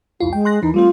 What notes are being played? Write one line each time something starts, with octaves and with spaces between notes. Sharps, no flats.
C2 F2 E4 F4
G#3 G5
C6 F#6 A#6
D#2 E3 D#4
G3 A3 C4 F4